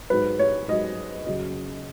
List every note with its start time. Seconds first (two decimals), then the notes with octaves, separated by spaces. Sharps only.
0.10 G#2 F#3 B4
0.39 C#5
0.68 G#2 F#3 D#5
1.26 F#2 C#3 F#3 D#5